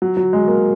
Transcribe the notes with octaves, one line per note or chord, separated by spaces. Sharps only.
F#3
F#3
G#3
A#3